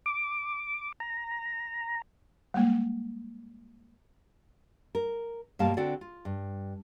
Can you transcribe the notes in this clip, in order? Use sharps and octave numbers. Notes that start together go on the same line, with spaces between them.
D6
A#5
G3 G#3 A#3
A#4
G2 B2 G3 A#3 F5 A5
D3 C4 F#4 A4 D5
F4
G2